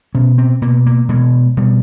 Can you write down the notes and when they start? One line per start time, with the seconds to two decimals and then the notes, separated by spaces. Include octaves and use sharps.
0.15 B2 C#4
0.38 C4
0.62 B2 A#3
0.86 A#3
1.09 B2 G#3
1.57 B2 G3